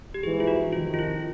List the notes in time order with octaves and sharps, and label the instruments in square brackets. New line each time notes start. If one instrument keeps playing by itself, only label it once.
[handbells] G4
[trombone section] A#1 G#2 E3 [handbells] G#4
[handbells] F4
F#4
[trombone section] F2 C3 D#3 [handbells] F4
[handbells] F4
E4